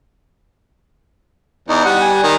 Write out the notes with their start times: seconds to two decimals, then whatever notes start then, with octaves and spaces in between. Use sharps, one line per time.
1.69 E2 D#4
1.85 G3 F#5
2.01 G#5
2.23 D#3